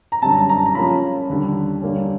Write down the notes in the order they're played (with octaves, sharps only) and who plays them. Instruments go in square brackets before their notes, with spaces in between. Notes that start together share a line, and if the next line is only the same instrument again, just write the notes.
[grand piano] A#5
F#2 D3 G3 C4 A5
A#5
A#5
C#3 F3 A#3 C#4 F4 B5
D#2 D3 G3
D3 G3 A#3 C#4